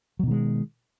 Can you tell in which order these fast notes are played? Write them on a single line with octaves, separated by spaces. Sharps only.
F#3 B2 D#3 G#3